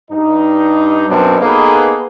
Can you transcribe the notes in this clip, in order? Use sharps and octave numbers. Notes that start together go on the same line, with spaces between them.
G2 D#4
F#2 B2 F#3 B3 C4 D4
A#3 B3 D#4 G#4 A4 B4